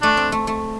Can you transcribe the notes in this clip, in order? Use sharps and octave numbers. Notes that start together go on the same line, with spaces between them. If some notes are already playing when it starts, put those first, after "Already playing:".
A3 D4
C4
A3
A3